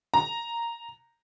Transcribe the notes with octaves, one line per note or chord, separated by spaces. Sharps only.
A#5